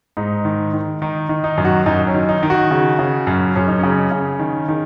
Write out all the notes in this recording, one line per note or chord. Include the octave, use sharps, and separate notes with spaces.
G#2 D#4
D#3
D#3
D#3 D#4
D#3
D#4
F#2
F#4
F#2 D#4
C#4
D#3
D#4
D#3
F#4
C#3
C#3
F#2
F#2 C#4
D#4
C#3 C#4
C#3
D#3
D#3